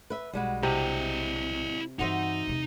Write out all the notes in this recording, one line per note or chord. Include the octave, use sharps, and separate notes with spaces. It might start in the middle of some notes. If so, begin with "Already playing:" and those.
B4 E5
B1 G3 G#3 F#4
C3 E4 D#5
G2 E3 D#4 F#4 C5 E5
E2 C3